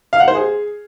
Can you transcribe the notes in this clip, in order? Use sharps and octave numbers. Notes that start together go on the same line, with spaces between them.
F5
F#5
C5
G#4